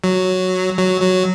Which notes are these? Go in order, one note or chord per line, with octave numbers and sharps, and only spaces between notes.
F#3
F#3
F#3